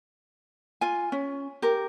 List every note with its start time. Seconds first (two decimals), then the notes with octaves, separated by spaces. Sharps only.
0.81 F4 G#5
1.12 C#4
1.62 G4 A#4